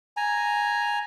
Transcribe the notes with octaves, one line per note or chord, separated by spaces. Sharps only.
G#5 A#5